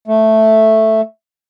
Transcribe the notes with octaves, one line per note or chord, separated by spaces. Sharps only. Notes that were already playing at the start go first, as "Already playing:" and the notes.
A3